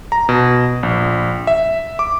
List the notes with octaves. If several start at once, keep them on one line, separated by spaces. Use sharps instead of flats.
A#5
B2
A#1
E5
D6